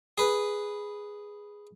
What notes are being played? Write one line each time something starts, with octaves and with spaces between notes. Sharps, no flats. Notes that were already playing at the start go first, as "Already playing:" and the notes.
G#4 B4